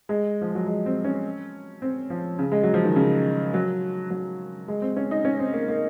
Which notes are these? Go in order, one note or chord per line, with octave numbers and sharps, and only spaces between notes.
G#3
F3
F#3
G#3
C4
C#4
C4
F3
C#3
G#3
F#3
F3
D#3
C#3
F#3
F#3
G#3
C4
C#4
D#4
C#4
C4
A#3
A#3